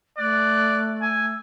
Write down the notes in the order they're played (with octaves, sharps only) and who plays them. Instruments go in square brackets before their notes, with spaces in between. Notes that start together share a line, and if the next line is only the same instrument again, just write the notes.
[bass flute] A3 [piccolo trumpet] D5 [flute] F#6
[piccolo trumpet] G#5 [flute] E6